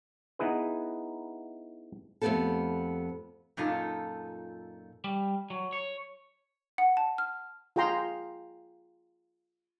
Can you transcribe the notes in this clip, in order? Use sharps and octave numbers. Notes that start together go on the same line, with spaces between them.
B3 D#4 E4 G#4 B4
F2 A3 B3 C4 G4 A4
F#2 A#2 D#4 F4 A4
G3
F#3
C#5
F#5
A5
F6
F4 G#4 G5 A#5 C6